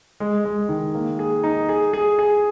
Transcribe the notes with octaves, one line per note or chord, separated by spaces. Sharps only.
G#3
G#3
D#3
A#3
G#4
D#4
G#4
G#4
G#4